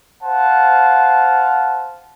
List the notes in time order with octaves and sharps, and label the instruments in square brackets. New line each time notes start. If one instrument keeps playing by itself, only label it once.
[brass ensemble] C5 F5 F#5 A5